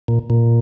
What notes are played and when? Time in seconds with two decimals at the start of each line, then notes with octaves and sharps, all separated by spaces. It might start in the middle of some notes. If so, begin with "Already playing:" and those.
0.08 A#2
0.30 A#2